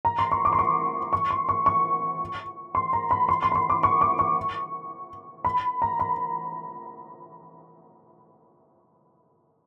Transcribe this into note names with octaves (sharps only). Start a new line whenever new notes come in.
A#5
C6
C#6
D6
C6
C#6
C#6
C6
C#6
C#6
C6
A#5
B5
C6
C6
B5
C6
D6
C#6
D6
C#6
B5
A#5
B5